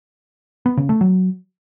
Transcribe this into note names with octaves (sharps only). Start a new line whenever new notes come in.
B3
C#3
A3
F#3